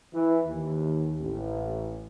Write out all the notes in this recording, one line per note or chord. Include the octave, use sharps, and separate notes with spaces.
E3
D#2
A1